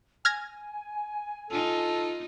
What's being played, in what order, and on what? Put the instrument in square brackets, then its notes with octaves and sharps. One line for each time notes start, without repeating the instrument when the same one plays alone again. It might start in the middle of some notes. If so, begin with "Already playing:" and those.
[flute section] G#5 [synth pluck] F6 G#6 A#6
[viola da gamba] D#4 F4 [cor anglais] A4